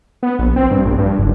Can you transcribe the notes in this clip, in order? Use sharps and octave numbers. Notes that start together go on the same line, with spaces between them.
B3
A#1
C4
G2
A#1
G2
F#1